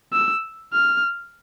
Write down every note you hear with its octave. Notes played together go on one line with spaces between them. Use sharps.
E6
F6